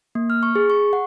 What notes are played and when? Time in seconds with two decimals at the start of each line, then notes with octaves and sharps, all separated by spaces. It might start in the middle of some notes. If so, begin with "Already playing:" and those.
0.15 A#3
0.30 F6
0.43 C#6
0.55 G#4
0.70 C#6
0.93 F#5